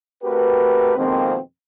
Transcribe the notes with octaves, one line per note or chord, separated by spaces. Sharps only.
A3 C4 F#4 G4 A#4 B4
F2 B2 D#3 G#3 A#3 C4